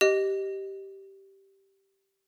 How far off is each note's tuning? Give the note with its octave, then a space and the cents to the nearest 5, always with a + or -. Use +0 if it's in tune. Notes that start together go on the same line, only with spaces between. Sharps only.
G4 -10 D#5 +0